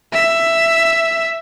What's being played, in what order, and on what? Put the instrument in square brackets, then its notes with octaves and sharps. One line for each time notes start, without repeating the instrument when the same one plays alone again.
[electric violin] E5